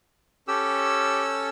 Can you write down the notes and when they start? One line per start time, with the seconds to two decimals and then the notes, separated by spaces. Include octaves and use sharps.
0.48 C#4 G4 A4 E6